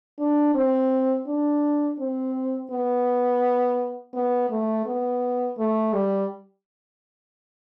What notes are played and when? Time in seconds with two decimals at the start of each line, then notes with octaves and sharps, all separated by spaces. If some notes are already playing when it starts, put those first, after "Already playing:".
0.19 D4
0.54 C4
1.27 D4
1.99 C4
2.71 B3
4.13 B3
4.50 A3
4.86 B3
5.58 A3
5.93 G3